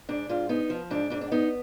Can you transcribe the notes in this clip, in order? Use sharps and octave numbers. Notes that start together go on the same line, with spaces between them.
G#2 D4
G#2 F4
B3 D#4
F3
G#2 D4
G#2 D4
D4
B3 D#4